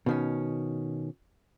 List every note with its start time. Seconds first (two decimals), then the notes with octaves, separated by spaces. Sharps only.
0.06 B2 D#3 C#4